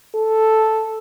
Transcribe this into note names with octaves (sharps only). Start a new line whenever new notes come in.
A4